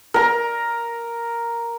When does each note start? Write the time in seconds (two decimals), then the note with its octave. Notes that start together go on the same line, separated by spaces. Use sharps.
0.14 A#4 A#5